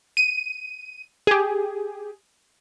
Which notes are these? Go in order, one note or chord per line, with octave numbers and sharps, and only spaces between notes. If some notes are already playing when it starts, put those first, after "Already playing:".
D#7
G4 G#4